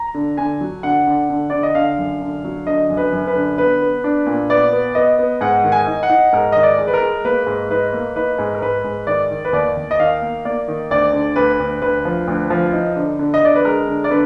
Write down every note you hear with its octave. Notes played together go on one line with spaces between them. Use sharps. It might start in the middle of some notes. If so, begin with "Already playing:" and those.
Already playing: A#5
D3
D3 G#5
F#3
D3 F#5
D3
D3
D3 D5
D#5
D3 F5
F#2
D3
F#3
D3 D#5
F#2
B4
F#2
B4
D3
B3 B4
B3
D4
A#2
B3 D5
B3
B3 D#5
B3
G#2 F#5
D#3
G#5
D#4
F#5
D#4
G#2 A#4
D#3 D#5
D5
G#3
B4
A#4
G#3
A#3 B4
G#2
D#4 B4
A#3
D#4 B4
G#2
A#4
G#2 B4
G#2
D#3 D5
D#3
B4
D#2 D5
D#2
D#5
D#3 F5
A#3
A#3 D5
D#3
D2 D5
D3
D2 B4
D2
D2 B4
F3
D2
F3
D#4
D3
D3
D#5
D3 D5
B4
G#3 A#4
D3
D5
D3 B4